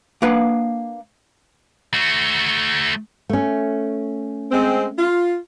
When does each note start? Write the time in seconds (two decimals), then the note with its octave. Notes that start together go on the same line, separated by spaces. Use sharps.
0.22 A#3 D4 B4 F5 F#5
1.94 A3 F#4
3.29 A3 C#4
4.52 G#3 C4
4.98 F4